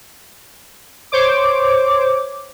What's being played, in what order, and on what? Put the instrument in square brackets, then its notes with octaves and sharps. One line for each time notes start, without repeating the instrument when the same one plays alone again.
[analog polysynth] C5 C#5 D6